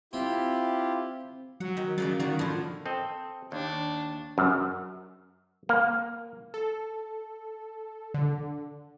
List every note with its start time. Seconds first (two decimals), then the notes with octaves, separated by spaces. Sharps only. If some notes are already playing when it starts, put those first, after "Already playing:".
0.13 C4 E4 F4 G4
1.60 F#3 F#5
1.77 D#3
1.98 C#3 F#3 A#3 D5
2.19 D#3 A#3 F#4 D5
2.39 A2 D3 F3
2.86 C4 A4 D#5
3.52 D#2 D4
4.38 F#2
5.69 A#3
6.54 A4
8.14 D3